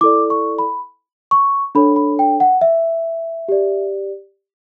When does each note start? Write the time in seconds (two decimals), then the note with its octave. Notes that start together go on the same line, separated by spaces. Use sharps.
0.01 E4 A4 D5 D6
0.30 C#6
0.58 B5
1.31 C#6
1.75 D4 A4 C#5 B5
1.96 B5
2.19 G5
2.40 F#5
2.61 E5
3.48 G4 D5